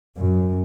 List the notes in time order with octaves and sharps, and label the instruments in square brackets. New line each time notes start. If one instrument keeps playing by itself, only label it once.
[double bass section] F#2